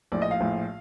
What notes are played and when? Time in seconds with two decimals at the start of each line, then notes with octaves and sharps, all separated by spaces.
0.12 A#1 A2 F3 D5
0.22 D#5
0.31 F5
0.40 A#1 A2 F3